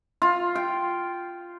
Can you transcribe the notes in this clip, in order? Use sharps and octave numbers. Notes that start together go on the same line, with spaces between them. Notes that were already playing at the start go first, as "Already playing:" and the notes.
F4
G5